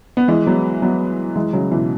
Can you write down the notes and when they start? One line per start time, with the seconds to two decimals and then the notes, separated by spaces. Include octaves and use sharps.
0.17 B3
0.28 E3 G#3
0.47 F#3 B3
0.82 F#3 B3
1.36 E3 G#3
1.53 C#3 F#3
1.72 B2 E3